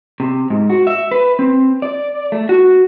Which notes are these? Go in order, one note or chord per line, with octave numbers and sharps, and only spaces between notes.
C3
G#2
F#4
E5
B4
C4
D5
A3
F#4